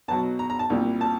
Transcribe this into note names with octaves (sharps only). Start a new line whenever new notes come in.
B1 B2 F#3 A5
A#5
A#5
A5
C2 A#2 G3
A5